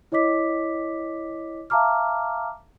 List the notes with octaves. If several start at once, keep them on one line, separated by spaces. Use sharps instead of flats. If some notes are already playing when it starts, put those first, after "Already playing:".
E4 C#5 D#5 D6 B6
E5 F5 A5 A#5 D6 F6